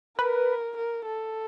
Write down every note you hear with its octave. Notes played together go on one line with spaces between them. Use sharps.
A#4 B4
A#4
A4